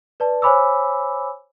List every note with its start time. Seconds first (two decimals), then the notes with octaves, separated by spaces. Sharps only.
0.20 B4 D5 A5
0.42 C5 C#5 G#5 B5 D6 E6